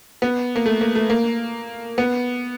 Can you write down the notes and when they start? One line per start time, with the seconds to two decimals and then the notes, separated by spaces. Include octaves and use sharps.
0.22 B3
0.56 A#3
0.66 A3
0.81 A#3
0.95 A3
1.10 A#3
1.98 B3